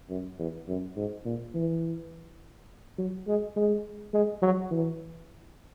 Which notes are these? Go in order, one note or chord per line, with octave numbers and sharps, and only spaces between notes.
F#2
E2
F#2
G#2
A#2
E3
F#3
G#3
G#3
G#3
F#3
E3